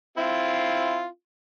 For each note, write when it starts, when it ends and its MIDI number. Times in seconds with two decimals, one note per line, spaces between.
0.18 1.06 60
0.18 1.06 64
0.18 1.06 65